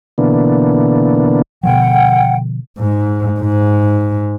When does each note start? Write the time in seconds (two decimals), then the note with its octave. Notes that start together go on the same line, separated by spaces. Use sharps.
0.18 B2 D3 E3 A#3 B3 D4
1.63 B2 D3 F3 F#5 G5
2.79 G#2
3.40 G#2